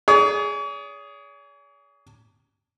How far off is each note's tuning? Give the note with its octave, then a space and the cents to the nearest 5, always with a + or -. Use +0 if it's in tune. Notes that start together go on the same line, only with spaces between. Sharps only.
G#4 +0 C#5 +45